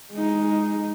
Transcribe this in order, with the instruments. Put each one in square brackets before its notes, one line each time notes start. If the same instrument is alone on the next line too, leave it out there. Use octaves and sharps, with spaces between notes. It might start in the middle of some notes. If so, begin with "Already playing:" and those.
[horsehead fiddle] G#3 D#4